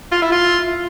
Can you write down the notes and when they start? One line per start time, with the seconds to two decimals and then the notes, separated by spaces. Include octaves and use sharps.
0.12 F4
0.22 E4
0.32 F4